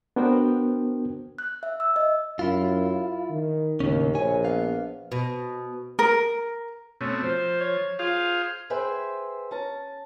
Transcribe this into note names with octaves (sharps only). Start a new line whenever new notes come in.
B3 D4 F#4 A#4 C5 G5
F#6
E5
E6
D#5
F#2 E4 F4
D#3
D#2 A2 C#3 C#4
A#1 C#5 G#5
B3 F5
B2
A#4
B2 A3 C4 C#4
F3 C5
C#5
F4 G#4 C5 F5
G#4 B4 C5 E5 G5 G#5
C#4 A5 A#5